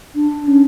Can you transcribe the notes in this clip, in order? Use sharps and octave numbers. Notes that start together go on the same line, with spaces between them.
D4
C#4